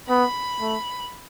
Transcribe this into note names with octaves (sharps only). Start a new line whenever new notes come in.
B3 B5
A3